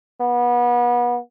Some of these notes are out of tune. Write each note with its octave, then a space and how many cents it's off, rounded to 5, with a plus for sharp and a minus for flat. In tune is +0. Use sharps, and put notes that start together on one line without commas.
B3 -30